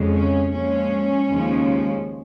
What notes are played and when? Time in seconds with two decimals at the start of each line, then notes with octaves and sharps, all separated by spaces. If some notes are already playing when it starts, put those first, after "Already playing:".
Already playing: F2 C#3 G#3
0.13 C#4
0.51 A#2 F3 G#3 C#4
1.28 D#2 C#3 F3 G#3